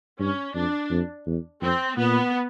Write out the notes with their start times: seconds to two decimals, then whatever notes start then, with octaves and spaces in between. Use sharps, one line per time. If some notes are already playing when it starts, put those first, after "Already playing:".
0.19 G2 C#4
0.55 F2 D4
0.90 F2
1.26 E2
1.61 F2 C4
1.97 A#2 B3